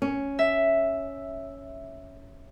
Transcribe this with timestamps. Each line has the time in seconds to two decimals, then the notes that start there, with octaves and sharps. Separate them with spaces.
0.02 C#4
0.39 E5